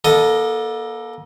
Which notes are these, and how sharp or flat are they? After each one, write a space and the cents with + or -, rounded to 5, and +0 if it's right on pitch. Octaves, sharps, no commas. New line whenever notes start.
A#3 +40 A4 +0 D#5 +0